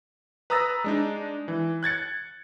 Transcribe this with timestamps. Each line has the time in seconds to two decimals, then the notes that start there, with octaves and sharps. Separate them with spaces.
0.50 B4 A#5 D#6 E6 A6 A#6
0.84 G#3 D4 D#4
1.48 E3
1.83 F#6 G#6 A6 C#7